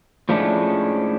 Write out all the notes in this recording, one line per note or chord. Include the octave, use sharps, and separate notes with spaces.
A2 F3 G#3 A3 C#4 D4